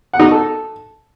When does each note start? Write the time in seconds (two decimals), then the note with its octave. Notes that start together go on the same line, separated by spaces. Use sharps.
0.13 F#5
0.20 D#4
0.26 F#4
0.32 A4